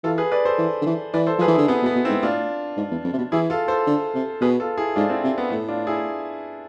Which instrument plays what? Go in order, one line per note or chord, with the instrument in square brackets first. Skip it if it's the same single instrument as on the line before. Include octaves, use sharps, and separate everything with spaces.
[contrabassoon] E3 [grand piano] F4 A4
[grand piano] G#4 B4
B4 D5
A4 C5
[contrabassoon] E3
D3
E3
[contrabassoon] E3 [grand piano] B4 D5
[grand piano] A4 C5
[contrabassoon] F3 [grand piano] G#4 B4
[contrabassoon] E3
[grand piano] E4 G#4
[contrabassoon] D3
[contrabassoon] C3 [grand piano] B3
[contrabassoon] B2
[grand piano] B3
[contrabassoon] B2
[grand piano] C4 E4
[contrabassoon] G#2
[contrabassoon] A2 [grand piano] D4 F4
[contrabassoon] G#2
E2
F2
C3
B2
[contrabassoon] E3 [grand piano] E4 G#4
[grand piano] F4 A4
A4 C5
[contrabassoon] D3
C3
[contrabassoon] B2 [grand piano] G#4 B4
[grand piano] F4 A4
E4 G#4
[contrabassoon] G#2 [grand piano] D4 F4
[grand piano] C4 E4
[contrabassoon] C3
[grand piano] B3
[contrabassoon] A2 [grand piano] A3
[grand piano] D4 F4
E4 G#4